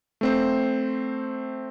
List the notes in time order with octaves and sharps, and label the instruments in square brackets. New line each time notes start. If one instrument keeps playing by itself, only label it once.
[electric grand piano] A3 C4 C5